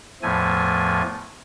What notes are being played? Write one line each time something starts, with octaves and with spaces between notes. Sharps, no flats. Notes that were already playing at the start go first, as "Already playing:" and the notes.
E2 A2 F3 A3 G#5